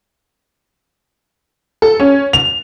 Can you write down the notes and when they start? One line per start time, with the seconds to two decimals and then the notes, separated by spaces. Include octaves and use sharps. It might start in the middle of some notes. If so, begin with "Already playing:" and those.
1.82 A4
2.00 C#4
2.33 F7